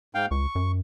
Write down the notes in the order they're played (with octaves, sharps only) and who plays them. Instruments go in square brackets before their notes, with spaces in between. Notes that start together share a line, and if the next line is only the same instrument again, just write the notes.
[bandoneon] G#2 F5 G5
[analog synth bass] C#2 [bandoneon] C#6
[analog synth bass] F#2